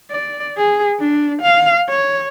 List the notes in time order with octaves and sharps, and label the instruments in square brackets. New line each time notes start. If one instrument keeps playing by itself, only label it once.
[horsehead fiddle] D5
G#4
D4
F5
C#5